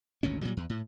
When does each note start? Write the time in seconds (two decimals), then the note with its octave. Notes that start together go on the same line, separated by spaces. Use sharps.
0.23 G#1 D2 A#2 C#4
0.42 A#2 F#3 G3
0.57 E2
0.70 A2